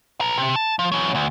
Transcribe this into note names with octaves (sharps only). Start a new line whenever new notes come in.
B4 A#5
C3
A5
F3
E3 F#3
D2